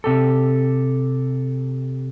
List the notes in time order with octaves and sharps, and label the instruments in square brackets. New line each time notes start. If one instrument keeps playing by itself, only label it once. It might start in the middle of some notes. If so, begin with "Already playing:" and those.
[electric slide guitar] C3 G4 A4